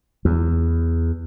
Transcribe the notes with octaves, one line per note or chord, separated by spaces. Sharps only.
E2